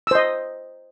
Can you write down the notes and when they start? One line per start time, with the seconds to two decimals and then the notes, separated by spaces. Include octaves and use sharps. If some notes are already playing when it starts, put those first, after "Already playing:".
0.07 E6
0.11 C5
0.15 D#5